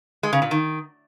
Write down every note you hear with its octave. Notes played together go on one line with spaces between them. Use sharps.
G#3
C#3
A#2
D#3